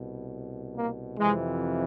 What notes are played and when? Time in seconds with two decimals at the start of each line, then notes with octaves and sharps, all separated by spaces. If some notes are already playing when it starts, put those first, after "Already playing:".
Already playing: C2 B2
0.76 A#3
1.18 F2 C3 E3 G#3